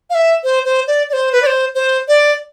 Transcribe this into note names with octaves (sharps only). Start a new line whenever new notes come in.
F5
E5
C5
C5
D5
D5
C5
B4
D5
C5
C5
D5